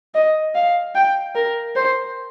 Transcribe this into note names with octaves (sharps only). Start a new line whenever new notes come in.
D#5
F5
G5
A#4
C5